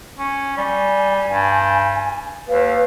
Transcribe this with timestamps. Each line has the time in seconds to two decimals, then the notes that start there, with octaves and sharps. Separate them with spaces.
0.18 C#4
0.57 G3 G#5
1.27 G2
2.49 D#2 B4 F5